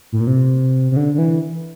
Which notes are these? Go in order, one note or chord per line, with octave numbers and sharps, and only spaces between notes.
A2
A#2
C3
C3
D3
D3
E3